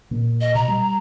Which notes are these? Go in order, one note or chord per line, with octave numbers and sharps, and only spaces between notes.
A#2
D#5
B2 A#5
G3